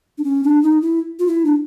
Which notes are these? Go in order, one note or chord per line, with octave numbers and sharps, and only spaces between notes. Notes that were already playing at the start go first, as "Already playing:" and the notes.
D4
C#4
D4
D#4
E4
F4
E4
D4